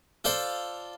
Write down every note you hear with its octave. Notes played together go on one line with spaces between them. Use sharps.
F4 A4 C5 D5 F5